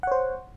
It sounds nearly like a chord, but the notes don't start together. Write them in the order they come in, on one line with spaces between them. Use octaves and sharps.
F#5 C#5 C5